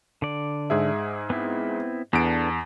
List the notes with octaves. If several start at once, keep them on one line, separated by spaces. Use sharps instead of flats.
D3 D5
G#2 G#4 E5
B3 C4 E4
E2 B3 D4 A4 D7